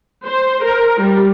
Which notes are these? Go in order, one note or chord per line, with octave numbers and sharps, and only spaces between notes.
C5
A#4
G3